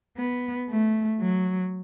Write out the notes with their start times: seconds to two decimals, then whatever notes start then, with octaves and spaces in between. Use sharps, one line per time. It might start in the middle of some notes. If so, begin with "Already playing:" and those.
0.17 B3
0.69 A3
1.20 F#3